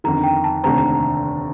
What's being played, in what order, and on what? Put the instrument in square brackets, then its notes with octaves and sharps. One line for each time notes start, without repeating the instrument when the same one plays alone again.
[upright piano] G1 F2 D#3 [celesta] A#5
[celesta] G5
A5
[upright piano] F1 D#2 D3 A3 C4 [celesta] A#5
[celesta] A#5